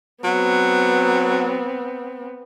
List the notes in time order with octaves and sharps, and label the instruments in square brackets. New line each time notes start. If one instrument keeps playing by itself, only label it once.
[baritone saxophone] F#3 [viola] B3 C4